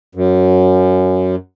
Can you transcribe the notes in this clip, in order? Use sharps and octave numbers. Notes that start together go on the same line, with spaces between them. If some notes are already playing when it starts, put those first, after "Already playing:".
F#2